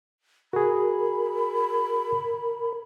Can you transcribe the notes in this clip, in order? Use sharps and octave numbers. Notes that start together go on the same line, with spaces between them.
F#4 G#4 A#4 B5